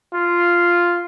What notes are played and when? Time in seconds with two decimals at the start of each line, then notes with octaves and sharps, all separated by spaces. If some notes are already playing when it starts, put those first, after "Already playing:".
0.14 F4